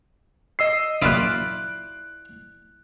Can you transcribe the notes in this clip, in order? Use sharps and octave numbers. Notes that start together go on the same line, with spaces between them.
D#5 E6 C7
A#1 F#2 E4 F4 D5 D#6 F#6 D7